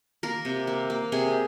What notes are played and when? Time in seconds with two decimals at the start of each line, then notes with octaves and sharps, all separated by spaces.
0.23 A#3 A#4
0.45 C3
0.67 A#3
0.90 A#3
1.12 C3 G#4